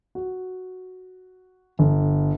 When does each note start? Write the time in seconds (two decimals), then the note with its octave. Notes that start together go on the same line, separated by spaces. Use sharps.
0.15 F#4
1.79 G1